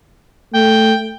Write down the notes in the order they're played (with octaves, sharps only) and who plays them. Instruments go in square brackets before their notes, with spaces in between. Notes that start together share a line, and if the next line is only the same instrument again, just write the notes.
[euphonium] A3 [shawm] G5